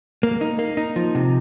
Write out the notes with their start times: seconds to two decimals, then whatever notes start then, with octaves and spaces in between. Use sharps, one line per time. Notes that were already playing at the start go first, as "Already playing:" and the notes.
0.23 A#3
0.41 D#4
0.59 A#3
0.77 D#4
0.96 F3
1.15 C3